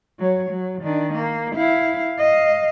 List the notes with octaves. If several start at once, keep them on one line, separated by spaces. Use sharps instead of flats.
F#3 C#5
F#3
D#3 D4
A#3
E4 F5
D#5 F5